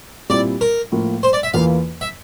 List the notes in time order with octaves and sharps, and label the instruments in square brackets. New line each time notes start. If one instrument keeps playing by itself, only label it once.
[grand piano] A#2 G3 C4 E4 [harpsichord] D5
[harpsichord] A#4
[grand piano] A2 F3 A#3
[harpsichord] C5
D5
E5
[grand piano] E2 E3 A#3 F4 [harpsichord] F5
[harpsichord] E5